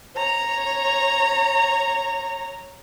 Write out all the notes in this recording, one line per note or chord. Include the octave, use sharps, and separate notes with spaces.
C#5 A#5